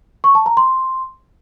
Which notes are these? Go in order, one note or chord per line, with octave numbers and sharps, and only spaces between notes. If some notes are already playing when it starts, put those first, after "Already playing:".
C#6
A5
A#5
C6